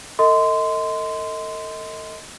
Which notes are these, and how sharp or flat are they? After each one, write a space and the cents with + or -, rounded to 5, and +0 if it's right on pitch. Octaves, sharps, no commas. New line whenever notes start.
A4 +45 D#5 +25 C6 -20